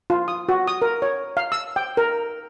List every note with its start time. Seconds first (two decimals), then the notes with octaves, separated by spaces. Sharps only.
0.10 F4
0.28 D#6
0.49 F#4
0.68 D#6
0.82 A#4
1.02 C#5
1.37 F5
1.52 E6
1.76 G5
1.97 A#4